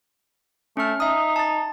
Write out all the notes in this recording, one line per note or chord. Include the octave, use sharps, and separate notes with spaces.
A3 C#4 F6
D#4 E5 D#6
A5 A6